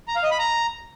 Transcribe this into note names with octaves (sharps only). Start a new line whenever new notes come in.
A#5
F5
D#5
B5
A#5